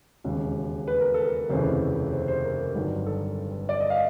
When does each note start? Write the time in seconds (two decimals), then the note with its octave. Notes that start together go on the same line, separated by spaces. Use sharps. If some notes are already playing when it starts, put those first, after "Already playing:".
0.24 E1 D#2 C#3
0.88 B4
1.01 A#4
1.14 A4
1.27 A#4
1.50 F1 D#2 C#3 E3 C5
2.12 C5
2.28 C5
2.45 A#4
2.75 G1 G2 D#3 F#3
3.06 A4
3.69 D5
3.80 D#5
3.90 F5